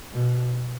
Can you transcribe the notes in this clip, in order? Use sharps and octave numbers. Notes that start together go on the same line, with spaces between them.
B2